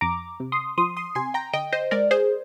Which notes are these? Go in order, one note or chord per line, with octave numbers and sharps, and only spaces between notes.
F2 A#5 D6
C3
C6 D#6
F3 C6 D#6
C6 D#6
C3 G#5 C6
G5 A#5
D3 D#5 G5
C5 D#5
G#3 A#4 D5
G#4 C5